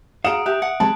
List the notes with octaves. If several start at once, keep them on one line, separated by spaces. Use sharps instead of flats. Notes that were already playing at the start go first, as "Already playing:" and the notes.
F#4 G#4 F5 F#5 A#5 D#6 D7 E7
G4 E5 F#6
F#5
G#3 C4 A5 B5